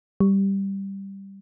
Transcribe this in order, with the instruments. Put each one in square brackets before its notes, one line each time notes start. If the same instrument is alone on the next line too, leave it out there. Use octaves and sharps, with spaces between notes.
[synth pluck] G3